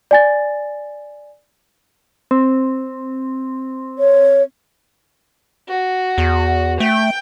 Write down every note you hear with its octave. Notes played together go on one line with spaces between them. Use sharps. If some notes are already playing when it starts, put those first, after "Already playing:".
D5 G#5 A6
C4
C#5
F#4
E2
A3 G5